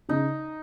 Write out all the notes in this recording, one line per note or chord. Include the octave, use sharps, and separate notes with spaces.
C#3 D#4